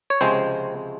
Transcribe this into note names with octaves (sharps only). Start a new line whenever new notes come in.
C#5
C#2 C3 F3 G#3 C4 C5